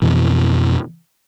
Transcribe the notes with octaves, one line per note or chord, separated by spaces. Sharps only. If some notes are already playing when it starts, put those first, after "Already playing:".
F2 B2 E3